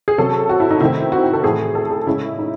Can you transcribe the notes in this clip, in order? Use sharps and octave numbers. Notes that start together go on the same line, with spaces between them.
G#4
C3 F#3 C#4 A4
F#4
E4
D#4
C3 D#3 A3 C4 E4
F#4
A4
A2 E3 A3 G#4
A4
G#4
C#3 G#3 C#4 E4
D#4